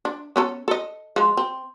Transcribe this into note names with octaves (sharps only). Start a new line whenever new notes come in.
D4
B3 C#4 A4
A4 D#5
F3 G#3
C4